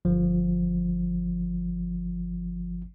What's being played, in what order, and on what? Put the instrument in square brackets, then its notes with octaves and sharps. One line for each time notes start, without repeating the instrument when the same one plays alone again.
[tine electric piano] G1 F3